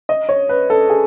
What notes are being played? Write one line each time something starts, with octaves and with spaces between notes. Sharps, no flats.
D#5
C#5
B4
A4
G#4